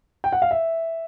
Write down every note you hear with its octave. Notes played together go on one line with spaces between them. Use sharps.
G5
F#5
F5
E5